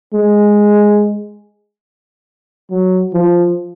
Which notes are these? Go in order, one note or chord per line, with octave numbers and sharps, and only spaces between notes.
G#3
F#3
F3